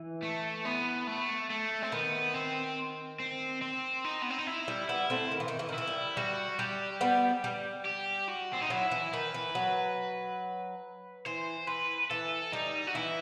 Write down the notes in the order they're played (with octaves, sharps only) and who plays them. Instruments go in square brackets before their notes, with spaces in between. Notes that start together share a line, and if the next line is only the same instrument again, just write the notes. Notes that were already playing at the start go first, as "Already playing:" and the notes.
Already playing: [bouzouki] E3
[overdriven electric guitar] A3
B3
A3
A3
C4
[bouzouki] D#3 [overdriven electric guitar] B3
[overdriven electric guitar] C4
C4
C4
D#4
B3
C4
D#4
E4
[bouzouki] G3
[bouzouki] G3 B3 [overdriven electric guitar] E4
[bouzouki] A3 C4
D#3
E3
D#3
E3
D#3
[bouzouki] E3 [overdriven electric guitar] E4
[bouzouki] G3
[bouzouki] G3 [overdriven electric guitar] F#4
[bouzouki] G3 [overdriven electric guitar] G4
[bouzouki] G3 B3
G3
[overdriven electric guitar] G4
F#4
C4
D#4
[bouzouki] F#3 [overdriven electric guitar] E4
[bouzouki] E3
[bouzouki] D#3 [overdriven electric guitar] B4
[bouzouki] E3
F#3
[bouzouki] E3 [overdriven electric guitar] C5
[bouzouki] E3 [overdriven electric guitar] B4
[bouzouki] E3 [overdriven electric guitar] A4
[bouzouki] G3 [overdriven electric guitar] D#4
[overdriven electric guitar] F#4
[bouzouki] E3 [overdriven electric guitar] E4